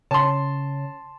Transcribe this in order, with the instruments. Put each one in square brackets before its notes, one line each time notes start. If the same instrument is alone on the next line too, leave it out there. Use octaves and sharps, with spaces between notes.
[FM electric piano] C#3 C#5 [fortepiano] A5 C6